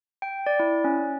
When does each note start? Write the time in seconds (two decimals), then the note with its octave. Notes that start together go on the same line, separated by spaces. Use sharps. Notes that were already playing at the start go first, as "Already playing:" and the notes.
0.22 G5
0.46 D5
0.60 E4
0.84 C#4